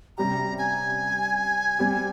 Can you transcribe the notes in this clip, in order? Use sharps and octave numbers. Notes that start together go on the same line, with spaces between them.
C3 G3 C#4 G4 A#5
G#5
G3 C4 G4